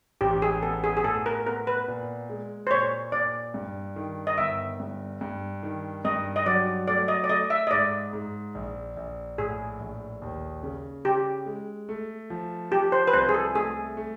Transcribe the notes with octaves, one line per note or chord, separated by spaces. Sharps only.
A1 G4
G#4
B3 A4
G#4
G#4
A2 A4
A#4
B3 A#4
B4
A#2
G#3
C5
A#2 C#5
A#2 D5
G2
D#3
D#5
G1 E5
G2
G2
D#3
G2 D#5
D#5
F#3 D5
A3 D5
D#5
D5
A3 D#5
E5
D#5
G#2 D5
G#2
A#1
A#1
A2 G#4
A#1
D#2
C#3
C#3 G4
G#3
A3
F3
F3 G4
C5
B4
C2 C5
G#4
A4
A3 G#4
A3